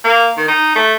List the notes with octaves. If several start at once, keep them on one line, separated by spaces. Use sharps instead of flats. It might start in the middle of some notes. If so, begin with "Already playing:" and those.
A#3
D#3
D#4
A3